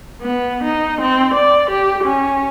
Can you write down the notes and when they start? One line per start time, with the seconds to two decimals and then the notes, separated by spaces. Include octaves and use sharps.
0.22 B3
0.64 D#4
1.01 C4
1.34 D5
1.71 G4
2.04 C#4